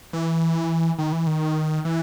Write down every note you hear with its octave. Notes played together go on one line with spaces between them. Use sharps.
E3
D#3
E3
D#3
E3